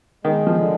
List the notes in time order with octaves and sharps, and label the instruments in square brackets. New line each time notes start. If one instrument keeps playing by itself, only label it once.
[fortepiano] D#3 [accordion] G#3
[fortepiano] F3
[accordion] D3